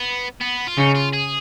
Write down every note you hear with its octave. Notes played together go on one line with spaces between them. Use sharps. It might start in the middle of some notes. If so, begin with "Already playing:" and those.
Already playing: B3
B3
F4
C#3 D#4
F4
G#4